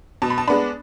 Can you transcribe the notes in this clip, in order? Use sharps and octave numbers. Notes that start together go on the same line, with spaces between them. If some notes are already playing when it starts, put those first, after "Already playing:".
B2 A5
B5
A5
G#3 B3 D4 B5